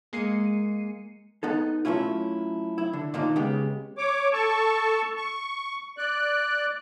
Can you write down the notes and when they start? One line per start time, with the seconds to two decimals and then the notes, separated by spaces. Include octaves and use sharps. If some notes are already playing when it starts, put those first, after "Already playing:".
0.13 G#3 A#3 C7 C#7 D#7
1.43 B3 D#4 A4
1.85 F#3 A3 C#4 E4 F4
2.78 E4
2.93 D3
3.14 A#2 D#3 A#3 D4 D#4 F4
3.36 C#3 G#3 B3 G4
3.98 C#5 D6
4.33 A4 A5 C#6
5.17 C#6
5.98 D5 F#6